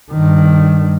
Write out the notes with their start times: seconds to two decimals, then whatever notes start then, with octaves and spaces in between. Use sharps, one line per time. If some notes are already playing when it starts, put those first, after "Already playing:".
0.11 G2 D#3